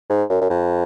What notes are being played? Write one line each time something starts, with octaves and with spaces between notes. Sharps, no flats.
G#2
F#2
F#2
F2